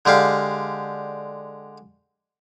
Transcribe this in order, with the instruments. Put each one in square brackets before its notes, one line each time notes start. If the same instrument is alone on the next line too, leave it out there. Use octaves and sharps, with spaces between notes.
[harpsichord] D3 G#3 G4 F5